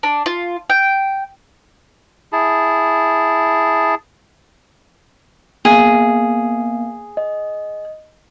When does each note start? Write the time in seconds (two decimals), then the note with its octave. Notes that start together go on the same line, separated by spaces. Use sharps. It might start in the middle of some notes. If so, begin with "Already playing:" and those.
0.03 D4
0.26 F4
0.70 G5
2.33 E4 G#4 A5
5.65 A#3 B3 G#4 F5
7.17 D#5